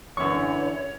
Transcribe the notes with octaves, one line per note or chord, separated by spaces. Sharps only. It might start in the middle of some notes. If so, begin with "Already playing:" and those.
F#2 D3 E3 C#5 C#6